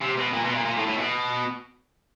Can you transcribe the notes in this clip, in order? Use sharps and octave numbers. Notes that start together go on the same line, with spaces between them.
C3
B2
A#2
B2
A#2
A#2
A2
A2
B2